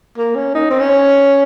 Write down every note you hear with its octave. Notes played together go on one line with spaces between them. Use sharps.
A#3
C#4
D#4
C4
C#4